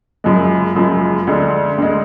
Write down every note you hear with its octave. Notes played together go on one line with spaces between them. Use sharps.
F#1 F#2 F3 G#3
F#1 F#2 F3 G#3
D2 D3 G#3
D2 D3 G#3